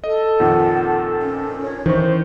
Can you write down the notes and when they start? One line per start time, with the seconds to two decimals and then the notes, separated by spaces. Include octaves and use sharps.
0.04 A4 D#5
0.40 F2 A#2 D#3 F#5
1.22 C#4
1.63 C#5
1.86 D#3 E3 C5 C#6